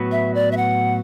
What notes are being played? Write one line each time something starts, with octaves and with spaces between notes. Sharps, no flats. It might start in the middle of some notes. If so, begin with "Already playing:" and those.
Already playing: A2 F#3 B3 F#4 B4
E5
D5
E5
F#5